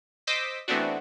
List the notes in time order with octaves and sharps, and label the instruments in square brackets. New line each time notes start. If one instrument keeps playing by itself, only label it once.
[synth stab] C5 D#5 D6 E6 B6
E3 A3 B3 C4 D4 F#4